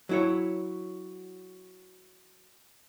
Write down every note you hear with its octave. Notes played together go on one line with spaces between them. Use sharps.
F#3 E4 C#5